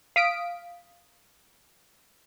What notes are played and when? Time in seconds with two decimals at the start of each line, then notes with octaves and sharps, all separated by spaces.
0.16 F5 D#6 B6 D7